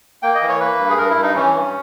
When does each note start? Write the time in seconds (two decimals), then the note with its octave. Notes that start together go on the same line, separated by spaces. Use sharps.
0.23 A#3 G5
0.35 D#5
0.42 E3
0.49 C#5
0.60 A#3 B4
0.79 G2
0.89 G#4
0.98 G2 A#4
1.10 E4
1.16 G2
1.22 D#4
1.35 E3 C#4
1.54 G2